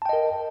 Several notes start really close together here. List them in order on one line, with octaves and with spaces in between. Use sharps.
A5 G5 D#5 A#4